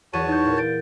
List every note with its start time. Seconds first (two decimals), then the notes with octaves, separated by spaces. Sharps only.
0.13 E2 F#4 C#5 A5 D#7
0.28 D#4 G6
0.45 A#2
0.57 G6 A6 D7